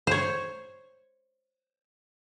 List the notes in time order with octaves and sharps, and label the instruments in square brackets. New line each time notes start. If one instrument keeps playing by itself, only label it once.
[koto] C5 C#5